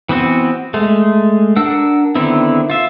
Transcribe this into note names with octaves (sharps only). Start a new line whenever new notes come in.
E3 B3 C4 F#4
G#3 A3
D4 A#4 F#5 E6
D3 D#3 B3 C4 E4
F4 E5